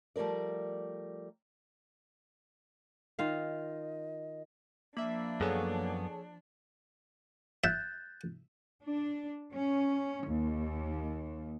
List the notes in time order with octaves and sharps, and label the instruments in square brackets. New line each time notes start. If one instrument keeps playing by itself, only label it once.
[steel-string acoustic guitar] F3 G3 A3 A#4 D5
[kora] D#3 F4 F5 [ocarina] D#5
[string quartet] F3 D4 [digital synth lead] A#3 [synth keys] E5 B5
[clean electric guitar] F#2 B3 [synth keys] G#4 A4 C#5
[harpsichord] E5 [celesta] F#6 G6 A6
[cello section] D4
C#4
D#2